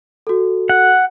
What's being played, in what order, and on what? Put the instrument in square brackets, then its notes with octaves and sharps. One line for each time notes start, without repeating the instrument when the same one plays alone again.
[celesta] F#4 A4
[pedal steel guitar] F#5